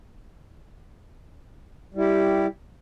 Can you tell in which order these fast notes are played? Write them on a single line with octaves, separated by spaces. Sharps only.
G3 E4 G4